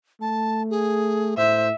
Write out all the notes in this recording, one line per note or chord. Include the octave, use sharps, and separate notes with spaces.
A3 A5
G#4
A2 C5 E5